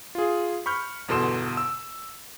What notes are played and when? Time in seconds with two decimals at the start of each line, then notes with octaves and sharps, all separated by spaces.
0.15 F4 G#4
0.66 B5 C#6 F6 G6
1.08 G1 E2 B2 A4 C6 E7
1.57 E6